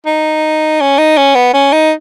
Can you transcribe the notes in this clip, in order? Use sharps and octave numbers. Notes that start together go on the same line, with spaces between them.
D#4
C#4
D#4
C#4
B3
C#4
D#4